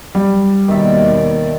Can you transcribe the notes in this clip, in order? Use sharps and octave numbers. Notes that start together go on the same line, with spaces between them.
G3
D#2 B2 D#3 D5 E5